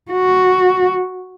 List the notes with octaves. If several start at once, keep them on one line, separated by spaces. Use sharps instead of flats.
F#4